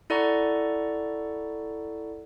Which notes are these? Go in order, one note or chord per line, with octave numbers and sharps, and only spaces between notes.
E4 A4 D5 F#5 A#5 C#6